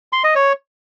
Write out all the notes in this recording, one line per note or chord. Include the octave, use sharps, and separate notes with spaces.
C6
D#5
C#5